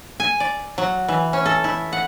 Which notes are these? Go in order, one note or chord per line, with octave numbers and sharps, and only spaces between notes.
G#5
D5
F#3
E3
C#4
A4
E4
F#5